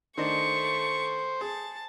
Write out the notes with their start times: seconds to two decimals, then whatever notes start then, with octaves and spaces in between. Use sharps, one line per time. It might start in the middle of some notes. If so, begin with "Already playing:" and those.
0.18 D#3 A3 D4 C5 D#5 C#6
1.41 G#4 A5